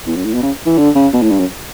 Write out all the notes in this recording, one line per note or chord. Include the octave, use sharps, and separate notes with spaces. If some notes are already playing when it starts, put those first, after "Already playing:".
E2
F#2
A2
B2
C#3
E3
D3
C#3
B2
A2
G2
F#2